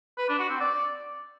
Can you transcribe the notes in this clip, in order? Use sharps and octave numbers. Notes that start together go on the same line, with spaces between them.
B4
D4
F#4
C4
D5